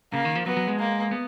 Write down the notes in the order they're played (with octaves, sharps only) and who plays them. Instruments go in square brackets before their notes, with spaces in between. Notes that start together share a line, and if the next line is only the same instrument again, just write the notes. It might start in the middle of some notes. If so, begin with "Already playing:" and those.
[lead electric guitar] C#3 [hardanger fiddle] A#3
[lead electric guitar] D#3
F3
[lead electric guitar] F#3 [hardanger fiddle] B3
[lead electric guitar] F#3
G#3
[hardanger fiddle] A#3
[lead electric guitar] B3